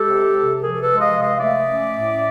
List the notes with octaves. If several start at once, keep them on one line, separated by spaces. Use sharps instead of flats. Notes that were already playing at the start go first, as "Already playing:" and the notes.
Already playing: G#3 G4 A4
C3
C3
F3 G#4 A#4
A#4
A4 B4
G#3
D#5 F5
C3
D#5 F5
A3 D5 E5
C#4
A2